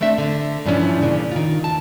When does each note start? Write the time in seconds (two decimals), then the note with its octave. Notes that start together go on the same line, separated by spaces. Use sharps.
0.01 A3 C4 D4 E5
0.18 D3
0.66 G2 E3 F3 C#4 D4
1.01 A#2 C#3 D4
1.31 D#3 F4
1.64 E2 A5